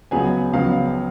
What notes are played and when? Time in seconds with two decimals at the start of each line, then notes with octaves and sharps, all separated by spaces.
0.11 C#2 C#3 F#3 B3 G#4 G#5
0.53 C#2 C#3 F#3 B3 F5